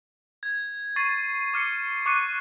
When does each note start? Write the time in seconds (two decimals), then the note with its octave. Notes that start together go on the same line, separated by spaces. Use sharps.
0.43 G#6
0.96 C#6 A6 C7 D#7
1.54 D6 F6 C7 C#7
2.06 C#6 D6 F#6 C#7 D#7